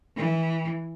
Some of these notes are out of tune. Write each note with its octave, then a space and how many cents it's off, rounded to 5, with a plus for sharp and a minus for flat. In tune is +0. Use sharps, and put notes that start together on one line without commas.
E3 -15